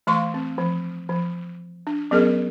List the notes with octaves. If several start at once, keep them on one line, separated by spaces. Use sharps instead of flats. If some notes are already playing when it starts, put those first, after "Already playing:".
E3 A3 F5 C6 C#6
C4
F3
F3
D4
F#3 B3 C#4 G#4 A#4 D#5